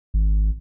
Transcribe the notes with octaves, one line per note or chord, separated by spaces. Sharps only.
G#1